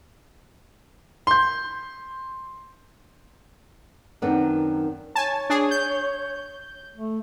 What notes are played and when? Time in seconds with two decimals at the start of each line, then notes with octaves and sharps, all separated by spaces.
1.27 C6 G6
4.22 F#2 D#3 B3 C4 D4
5.15 C#5 G#5 A5
5.50 D4 G#4
5.71 G6
6.96 A3